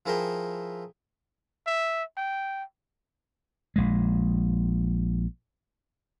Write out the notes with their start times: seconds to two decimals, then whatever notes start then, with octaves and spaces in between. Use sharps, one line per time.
0.06 F3 E4 G#4 A#4 E5 G5
1.67 E5
2.17 G5
3.76 A#1 G#3